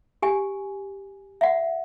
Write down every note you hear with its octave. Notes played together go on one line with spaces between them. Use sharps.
G4 G#5
E5 F#5